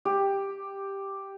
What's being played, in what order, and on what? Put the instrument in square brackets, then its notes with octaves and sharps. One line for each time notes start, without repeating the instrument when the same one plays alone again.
[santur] G4